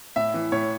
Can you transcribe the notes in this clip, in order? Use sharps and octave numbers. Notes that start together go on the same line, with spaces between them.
A2 E5
E3
A2 C#5